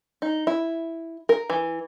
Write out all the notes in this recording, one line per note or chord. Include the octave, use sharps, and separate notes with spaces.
D#4
E4
A#4
E3